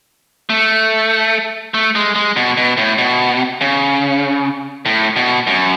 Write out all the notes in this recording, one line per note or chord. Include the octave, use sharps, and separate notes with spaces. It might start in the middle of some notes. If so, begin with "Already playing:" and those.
A3
A3
G#3
G#3
B2
B2
A2
B2
C#3
A2
B2
F#2